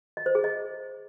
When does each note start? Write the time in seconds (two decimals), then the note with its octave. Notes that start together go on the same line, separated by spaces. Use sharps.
0.17 D#5
0.26 C5
0.35 G#4
0.44 D#5